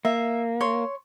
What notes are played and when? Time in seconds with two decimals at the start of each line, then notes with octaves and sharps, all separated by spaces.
0.05 A#3 E5
0.61 C#5 C6